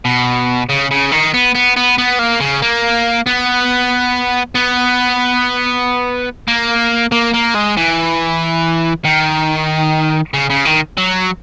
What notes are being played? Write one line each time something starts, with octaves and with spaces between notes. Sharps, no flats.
B2
C#3
C#3
D#3
B3
B3
B3
B3
A#3
C#3
A#3
B3
B3
A#3
A#3
A#3
G#3
E3
D#3
C#3
C#3
D#3
F#3